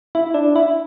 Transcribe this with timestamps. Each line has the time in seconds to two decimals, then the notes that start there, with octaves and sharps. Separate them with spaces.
0.15 E4
0.34 D4
0.56 E4